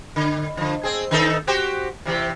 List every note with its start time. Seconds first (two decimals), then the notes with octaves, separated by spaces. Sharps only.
0.16 D3
0.57 D3 F3
0.83 C4 G#4
1.11 D#3 D#4 A4
1.47 F#4 G4 C5
2.06 C3 E3 G4